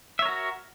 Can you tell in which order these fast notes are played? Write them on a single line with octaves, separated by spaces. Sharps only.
E5 C#5 A#4 F#4